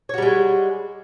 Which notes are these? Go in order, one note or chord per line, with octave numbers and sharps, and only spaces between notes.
G3 G#3 F#4 C#5